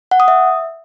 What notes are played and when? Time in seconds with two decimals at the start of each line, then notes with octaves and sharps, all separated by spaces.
0.11 F#5
0.20 D#6
0.28 E5